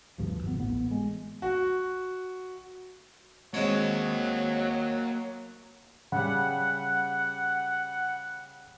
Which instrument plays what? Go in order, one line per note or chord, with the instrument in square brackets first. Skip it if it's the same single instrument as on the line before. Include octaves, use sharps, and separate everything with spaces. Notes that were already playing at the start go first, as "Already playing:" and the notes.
[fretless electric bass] D2 G2 F3
F1 B3
A1 B3
G#3
[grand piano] F#4
[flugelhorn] F#3 [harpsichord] G#3 C4 C#5 [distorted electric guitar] A#3 D#5
[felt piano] C#3 G3 [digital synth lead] F#5